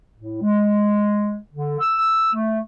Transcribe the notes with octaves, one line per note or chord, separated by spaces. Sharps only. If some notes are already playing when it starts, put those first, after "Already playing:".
A2
G#3
D3
E6
A3